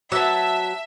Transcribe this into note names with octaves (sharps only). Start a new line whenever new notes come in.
F#3 B3 E5 A5 E6